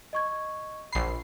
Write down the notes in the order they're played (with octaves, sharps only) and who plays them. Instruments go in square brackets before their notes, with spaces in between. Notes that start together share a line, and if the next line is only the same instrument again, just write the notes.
[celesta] D#5 C#6 G#6
[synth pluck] A#1 C7 [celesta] B5